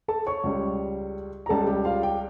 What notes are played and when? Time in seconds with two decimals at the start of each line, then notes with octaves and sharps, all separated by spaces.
0.08 A4 A5
0.26 C#5 C#6
0.43 C#2 C#3 G3
1.46 A#5
1.49 C#2 C#3 G3 A4 A5
1.67 G4 G5
1.85 F4 F5
2.02 G4 G5